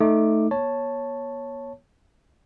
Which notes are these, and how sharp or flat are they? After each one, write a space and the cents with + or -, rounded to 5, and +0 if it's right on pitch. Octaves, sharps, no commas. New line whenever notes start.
A3 +0 D#4 +0 D6 +10
B3 -40 C#5 +0 A5 +0